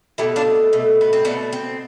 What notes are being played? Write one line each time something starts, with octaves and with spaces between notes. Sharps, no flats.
B2 A3 E4 G4
D4 F4
B2 A3
B3
C4
B2 A3 B3 D4
C4